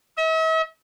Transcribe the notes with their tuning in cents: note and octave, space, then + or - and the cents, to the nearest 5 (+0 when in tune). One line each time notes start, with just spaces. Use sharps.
E5 -45